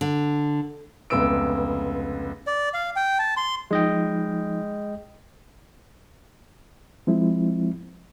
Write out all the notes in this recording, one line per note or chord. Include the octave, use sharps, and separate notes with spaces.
D3
F1 C#2 B3 E6 D7
D5
F5
G5
A5
C6
F3 G#3 D#4 D#5 G5
F3 G#3 C4 E4